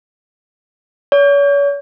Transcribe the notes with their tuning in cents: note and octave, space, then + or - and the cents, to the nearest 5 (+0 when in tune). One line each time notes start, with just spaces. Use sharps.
C#5 +40